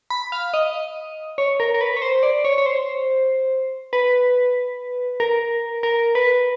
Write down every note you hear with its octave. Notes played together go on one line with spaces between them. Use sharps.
B5
F5
D#5
C#5
A#4
A#4
B4
C#5
C5
D5
C#5
C#5
C5
B4
A#4
A#4
B4